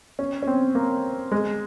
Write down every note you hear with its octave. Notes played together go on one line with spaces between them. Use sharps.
C#4
C#4
C4
A#3
G#3